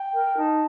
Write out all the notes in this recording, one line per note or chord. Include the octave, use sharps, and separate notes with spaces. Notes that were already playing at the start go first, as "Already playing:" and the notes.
Already playing: G5
A#4
D#4 A5